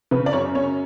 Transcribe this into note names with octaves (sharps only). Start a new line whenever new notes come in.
C#3 B4
D5
F#2 C#5
C#4 C#5